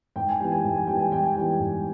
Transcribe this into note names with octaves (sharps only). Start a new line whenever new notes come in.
G#2 G5
G#5
E3 G3 B3 G5
G#5
G#2 G5
G#5
E3 G3 B3 G5
G#5
G#2 G5
G#5
E3 G3 B3 G5
G#2